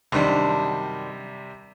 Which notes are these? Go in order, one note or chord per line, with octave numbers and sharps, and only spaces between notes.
F#2 C3 D#3 G3 D4